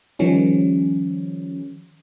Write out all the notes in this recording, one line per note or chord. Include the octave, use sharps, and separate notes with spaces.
D#3 F3 G3 C#4